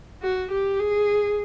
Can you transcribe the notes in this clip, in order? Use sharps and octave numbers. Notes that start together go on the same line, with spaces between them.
F#4
G4
G#4